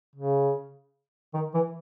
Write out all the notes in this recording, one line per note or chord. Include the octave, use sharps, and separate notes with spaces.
C#3
D#3
E3